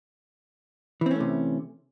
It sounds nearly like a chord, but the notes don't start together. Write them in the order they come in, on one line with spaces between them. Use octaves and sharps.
E3 C4 C#4 A3 C3